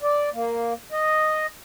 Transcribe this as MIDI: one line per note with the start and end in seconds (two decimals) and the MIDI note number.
0.02 0.29 74
0.33 0.73 58
0.92 1.46 75